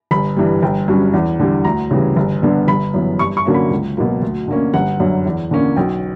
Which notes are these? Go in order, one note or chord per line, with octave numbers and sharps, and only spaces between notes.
G1 B5
G2 E3 G3
G1 G5
G2 F#3 C#4
E2
D3 G3
D2 A#5
C#3 E3 G3
G1
G2 D3 G3 B3
G1 B5
F#2 E3 B3
G2 C#6
C#6
D3 F#3 A#3 C#4
B5
C#2
B2 F#3 A#3
D2
D3 A#3 C#4
G1 F#5
F#2 D3
E2
D3 A#3 C#4
B1 G5